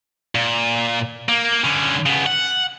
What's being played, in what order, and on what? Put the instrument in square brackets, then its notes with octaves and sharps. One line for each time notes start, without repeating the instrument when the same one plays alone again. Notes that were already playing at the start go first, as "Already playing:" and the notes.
[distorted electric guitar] A#2
A#3
D3 C#4
C#3 B3
F#5